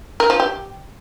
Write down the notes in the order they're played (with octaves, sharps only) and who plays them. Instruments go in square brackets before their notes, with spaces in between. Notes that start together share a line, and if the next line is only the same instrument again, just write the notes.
[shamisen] A#4
F3
G4